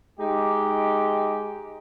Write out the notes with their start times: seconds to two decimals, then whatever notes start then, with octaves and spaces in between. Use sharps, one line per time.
0.20 G#3 D#4 G4